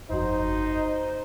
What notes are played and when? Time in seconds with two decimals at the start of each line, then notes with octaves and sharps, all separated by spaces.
0.10 G1 F2 D#4 F#4 C5